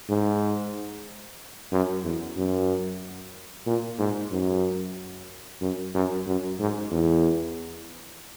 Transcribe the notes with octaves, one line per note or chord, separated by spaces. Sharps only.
G#2
F#2
E2
F#2
A#2
G#2
F#2
F#2
F#2
F#2
G#2
E2